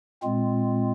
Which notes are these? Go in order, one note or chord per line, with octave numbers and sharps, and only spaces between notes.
A#2 G#3 C4 F4